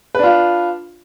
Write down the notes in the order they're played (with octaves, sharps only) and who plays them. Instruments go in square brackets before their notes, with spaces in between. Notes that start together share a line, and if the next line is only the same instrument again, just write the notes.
[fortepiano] B4
D4
F4